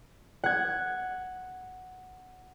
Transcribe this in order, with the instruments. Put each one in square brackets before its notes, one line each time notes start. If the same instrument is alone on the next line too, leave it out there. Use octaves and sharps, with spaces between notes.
[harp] F#5 G#6